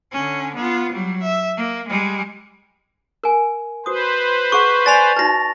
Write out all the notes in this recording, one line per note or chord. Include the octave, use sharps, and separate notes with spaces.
D3 C#4
B3 F4
F#3 G3
E5
A#3
G3 G#3
A#4 G#5
F#4 B4 C5 D#6
G#4 F#5 C#6
D5 G#5 C6 A6 F7
D#4 F#4 B4 A5 A#6